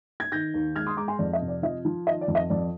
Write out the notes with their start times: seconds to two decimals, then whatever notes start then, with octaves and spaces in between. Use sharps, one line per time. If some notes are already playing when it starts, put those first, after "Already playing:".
0.20 G#6
0.32 D#3 G6 A#6
0.54 D#2
0.75 G#3 F6 G#6
0.87 C6 D#6
0.97 G#3 A#5 D6
1.08 G#5 C6
1.19 F2 D5
1.33 D#5
1.42 C3
1.48 D5
1.63 F3 D#5
1.85 F3
2.07 D#3 D#5
2.21 D5
2.28 F2
2.35 D#5
2.50 F2 D5